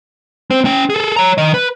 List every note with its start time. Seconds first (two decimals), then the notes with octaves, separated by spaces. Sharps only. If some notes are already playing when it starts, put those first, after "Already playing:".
0.51 C4 C5
0.65 C#4 G5
0.90 G#4 A4
1.16 C#5 A#5
1.38 D#3 D#5
1.54 B4